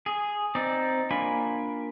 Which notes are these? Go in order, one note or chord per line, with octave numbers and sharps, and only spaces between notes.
G#4
C4 D#4 D5
A#3 D4 F4 G#5 B5